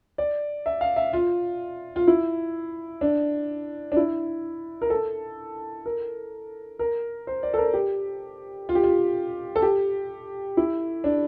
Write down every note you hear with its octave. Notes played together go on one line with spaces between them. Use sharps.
D5
E5
F5
E5
F4
F4
E4
D4
D4
E4
A#4
A4
A#4
A#4
C5
D5
A4
A#4
G4
F4
G4
F4
A4
G4
E4
D4